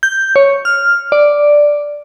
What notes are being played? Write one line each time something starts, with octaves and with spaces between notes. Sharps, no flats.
G6
C#5
F6
D5